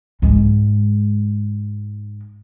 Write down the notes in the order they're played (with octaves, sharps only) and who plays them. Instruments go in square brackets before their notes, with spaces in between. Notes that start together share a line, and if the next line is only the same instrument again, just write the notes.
[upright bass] G#2 G#3